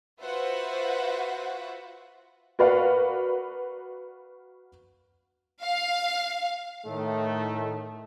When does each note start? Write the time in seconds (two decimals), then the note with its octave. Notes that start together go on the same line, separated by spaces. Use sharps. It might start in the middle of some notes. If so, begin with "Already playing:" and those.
0.20 F4 F#4 B4 C5 E5 F#5
2.59 F#4 A#4 B4 D5 F5 F#5
5.63 F5
6.87 A2 D#3 A3